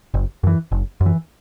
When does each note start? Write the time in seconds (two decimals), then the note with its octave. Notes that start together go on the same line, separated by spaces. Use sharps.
0.14 F#1
0.43 F#2 E3
0.72 F#1
1.01 F#2
1.06 E3